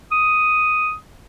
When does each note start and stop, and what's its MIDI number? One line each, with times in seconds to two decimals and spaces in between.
0.12 0.95 87